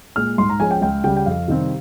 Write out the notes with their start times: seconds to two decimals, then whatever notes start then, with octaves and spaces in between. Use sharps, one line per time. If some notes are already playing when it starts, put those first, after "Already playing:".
0.16 A#2 G#3 F6
0.38 G#2 C6
0.49 A#5
0.60 F3 G#3 C#4 G#5
0.71 G5
0.81 C#2 G5
1.04 C#3 G3 G5
1.17 G5
1.26 F2 F5
1.48 C3 D#3 G3 C4